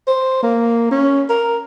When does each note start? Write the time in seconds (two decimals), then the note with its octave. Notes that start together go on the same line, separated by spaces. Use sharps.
0.07 C5
0.42 A#3
0.91 C#4
1.29 A#4